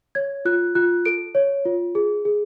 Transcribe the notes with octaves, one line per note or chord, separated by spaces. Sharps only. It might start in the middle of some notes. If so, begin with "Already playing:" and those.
C#5 G#6
F4 F#6
F4 F#6
A4 D7
C#5
F4
G#4
G#4